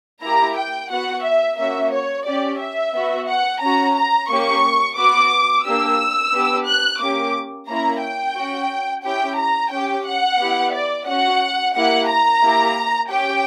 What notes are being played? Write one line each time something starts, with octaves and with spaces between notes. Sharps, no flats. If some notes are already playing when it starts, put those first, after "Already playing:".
A#3 E4 G4 A#5
G5
B3 F#4 F#5
E5
A#3 C#4 F#4 E5
C#5
C#4 G4 D5
E5
B3 F#4
F#5
C#4 F#4 A#5
A#5
A#3 C#4 G4 C#6
B3 F#4 D6
A#3 D4 G4 E6
B3 D4 G4
F#6
A#3 C#4 G4 D6
A#3 C#4 E4 A#5
G5
C#4 F#4
C#4 E4 G4 G5
A#5
C#4 G4 G5
F#5
B3 E4 G4
D5
C#4 F#4 F#5
A#3 E4 G4 F#5
A#5
A#3 E4 G4
C#4 G4 G5